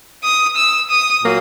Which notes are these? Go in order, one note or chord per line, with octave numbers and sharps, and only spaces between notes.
D#6
E6
D#6
A#2 F#3 A#3